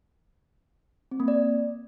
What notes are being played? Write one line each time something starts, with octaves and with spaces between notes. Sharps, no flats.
C4
A#3
D5